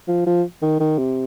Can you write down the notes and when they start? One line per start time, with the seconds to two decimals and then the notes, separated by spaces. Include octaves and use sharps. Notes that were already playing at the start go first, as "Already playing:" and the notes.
0.08 F3
0.26 F3
0.62 D#3
0.80 D#3
0.98 C3